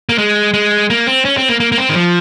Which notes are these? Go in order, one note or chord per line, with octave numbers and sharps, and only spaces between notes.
A#3
G#3
G#3
A#3
C4
C#4
C4
A#3
A#3
A#3
C4
D#3
F3